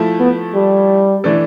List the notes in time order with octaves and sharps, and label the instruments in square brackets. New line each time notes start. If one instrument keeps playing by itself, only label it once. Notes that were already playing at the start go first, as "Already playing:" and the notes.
Already playing: [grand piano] F3 A3 E4
[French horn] B3
G3
[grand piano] E3 A3 D4 A4